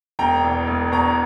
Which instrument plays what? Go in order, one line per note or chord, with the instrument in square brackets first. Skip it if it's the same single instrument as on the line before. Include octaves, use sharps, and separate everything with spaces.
[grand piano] E1 G5 A#5
E2
E1
E2 A#5 C#6